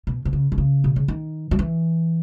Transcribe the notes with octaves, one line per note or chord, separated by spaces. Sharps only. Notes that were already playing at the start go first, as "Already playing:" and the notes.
B2
B2
C#3
B2
C#3
B2
C#3
D#3
F#3
E3